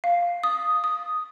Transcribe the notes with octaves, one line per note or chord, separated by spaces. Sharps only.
F5
D#6
D#6